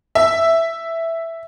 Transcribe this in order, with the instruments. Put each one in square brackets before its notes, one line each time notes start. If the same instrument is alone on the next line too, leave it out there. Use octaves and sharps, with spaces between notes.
[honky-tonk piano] E5